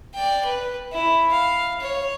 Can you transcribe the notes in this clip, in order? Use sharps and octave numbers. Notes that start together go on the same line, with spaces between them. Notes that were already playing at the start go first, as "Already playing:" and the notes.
D5 G5
B4
E4
F5
C#5